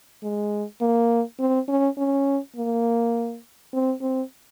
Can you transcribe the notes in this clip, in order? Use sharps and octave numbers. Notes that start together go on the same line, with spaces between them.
G#3
A#3
C4
C#4
C#4
A#3
C4
C4